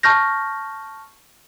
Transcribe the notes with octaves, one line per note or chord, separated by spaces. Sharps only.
A5 C#6 F6 G6 A#6